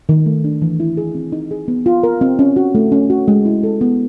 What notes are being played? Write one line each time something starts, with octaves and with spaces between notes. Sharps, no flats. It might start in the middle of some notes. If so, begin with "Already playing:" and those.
D#3
A3
D4
E3
E4
G#4
C4
D#4
G#4
B3
F4
A#4
C4
C#4
F#4
A3
C#4
F#4
G#3
E4
A4
B3